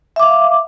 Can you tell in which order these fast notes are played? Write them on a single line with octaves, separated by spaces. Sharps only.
E5 D6 F5